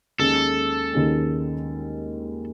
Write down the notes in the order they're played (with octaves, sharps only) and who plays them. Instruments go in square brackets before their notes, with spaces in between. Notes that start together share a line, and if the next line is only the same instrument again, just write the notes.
[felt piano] D#2 D#3 G#3 C#4 [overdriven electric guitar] A4
[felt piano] D#2 D#3 G#3 C#4